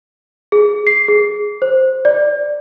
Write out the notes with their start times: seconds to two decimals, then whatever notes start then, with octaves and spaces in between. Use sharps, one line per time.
0.52 G#4
0.87 C7
1.08 G#4
1.62 C5
2.05 D5